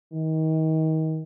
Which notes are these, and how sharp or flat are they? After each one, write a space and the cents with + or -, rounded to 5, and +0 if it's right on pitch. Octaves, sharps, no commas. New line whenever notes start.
D#3 +30